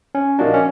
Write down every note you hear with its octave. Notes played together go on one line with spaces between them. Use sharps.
C#4
A#2 F3 A#3 D4 D#4 F#4
C#4